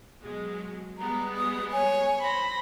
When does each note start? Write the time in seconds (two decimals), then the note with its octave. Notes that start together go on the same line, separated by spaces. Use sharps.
0.24 B2 F#3 G#3
0.98 G3 G#3 B3 A#5
1.37 D#6
1.72 C#5 G#5
2.21 C5 B5 A#6